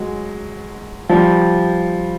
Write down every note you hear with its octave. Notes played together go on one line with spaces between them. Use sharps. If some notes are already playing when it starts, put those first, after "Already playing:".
Already playing: F#3 G#3
F3 G3